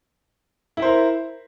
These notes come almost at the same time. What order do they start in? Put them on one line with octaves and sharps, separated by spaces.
E4 E5 C5 A#4